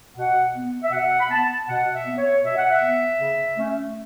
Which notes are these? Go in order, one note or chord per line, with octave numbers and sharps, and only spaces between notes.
B2 F#5
B3
E5
B2 F#5
B5
B3 A5
B2 F#5
E5
B3
C#5
B2 E5
F#5
E5
B3
C#3
A3 C#4